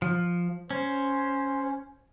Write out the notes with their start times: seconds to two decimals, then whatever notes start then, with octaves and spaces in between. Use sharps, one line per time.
0.02 F3
0.71 C#4 C5